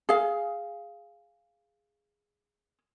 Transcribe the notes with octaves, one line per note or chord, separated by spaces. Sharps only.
G#4 F5